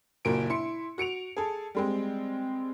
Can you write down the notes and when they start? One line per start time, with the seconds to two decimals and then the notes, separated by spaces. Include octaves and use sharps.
0.25 F#1 A#2 F#4 A#4 D7
0.50 E4 C6 C#7
0.98 F#4 C#7 D7 F7
1.37 G#4 A4
1.75 G3 G#3 C4